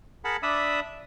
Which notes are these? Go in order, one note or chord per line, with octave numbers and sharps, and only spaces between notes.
G#4 A#4 F#5 A5 B5
D4 D5 E5 B5 D#6 E6